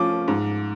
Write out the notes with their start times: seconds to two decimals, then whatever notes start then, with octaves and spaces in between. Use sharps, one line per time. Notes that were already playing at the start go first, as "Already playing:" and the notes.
Already playing: F3 A3 C#4 D6
0.28 G#2